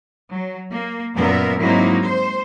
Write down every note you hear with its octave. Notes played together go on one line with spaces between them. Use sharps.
F#3
A#3
F#2 A#2 B3 A#4 E5
G#2 F#3 A#3 C4 D#4 E4
C5